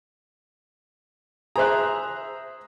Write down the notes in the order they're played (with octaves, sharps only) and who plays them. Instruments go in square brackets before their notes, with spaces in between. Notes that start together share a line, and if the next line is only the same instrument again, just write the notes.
[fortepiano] G#4 C5 F#6 [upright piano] E5 A#5